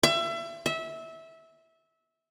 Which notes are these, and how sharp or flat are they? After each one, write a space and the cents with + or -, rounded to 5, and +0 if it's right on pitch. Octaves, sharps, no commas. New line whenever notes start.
E5 +30
E5 -20